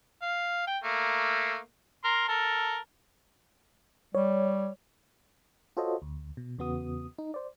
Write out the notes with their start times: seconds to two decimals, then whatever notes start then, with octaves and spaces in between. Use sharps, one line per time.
0.22 F5
0.67 G5
0.84 A3 A#3
2.04 A#4 C6
2.29 A4 A#4
4.15 G3 C#5
5.77 F4 F#4 A4 C5 C#5 D#5
6.02 D2
6.37 B2
6.58 E2 C#3 B3 F#4 D#6
7.18 D#4
7.34 C5 D5